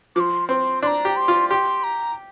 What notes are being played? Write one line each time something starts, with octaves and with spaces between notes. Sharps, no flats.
F3 C6 D6
C4 C6
D4 A#5 C6
G4
C6
F4
G4 C6
A#5